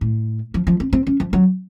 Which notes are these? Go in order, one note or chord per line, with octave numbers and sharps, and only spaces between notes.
A2
F3
F3
C4
C4
C#4
F3
F#3